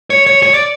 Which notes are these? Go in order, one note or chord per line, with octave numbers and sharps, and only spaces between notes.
C#5
C#5
C#5
D5